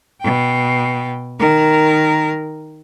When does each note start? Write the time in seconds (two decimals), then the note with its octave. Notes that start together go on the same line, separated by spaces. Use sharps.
0.21 B2 G5
1.40 D#3 A#4